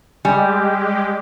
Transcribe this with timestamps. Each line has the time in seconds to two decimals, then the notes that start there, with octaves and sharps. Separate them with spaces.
0.25 G3 G#3 G4 G#5